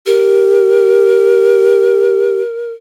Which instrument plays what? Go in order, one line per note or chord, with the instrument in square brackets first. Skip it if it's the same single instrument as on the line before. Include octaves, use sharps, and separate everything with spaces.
[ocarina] G4 [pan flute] A#4